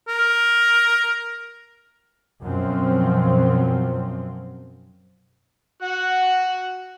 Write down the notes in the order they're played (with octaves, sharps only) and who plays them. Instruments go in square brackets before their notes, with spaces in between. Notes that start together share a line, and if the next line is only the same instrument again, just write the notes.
[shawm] A#4
[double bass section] F#2 B2 F3 F#3 C4
[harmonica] F#4 F#5